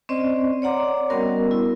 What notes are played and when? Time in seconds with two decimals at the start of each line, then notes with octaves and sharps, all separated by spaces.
0.09 C4 C#4 C5 D5 D#5
0.62 C#5 D5 F#5 A#5 C6 D6
1.10 G3 B3 C#4 F#4 A#4 D#5
1.51 E4